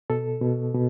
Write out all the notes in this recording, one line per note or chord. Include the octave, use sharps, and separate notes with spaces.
B2 A4
B2
B2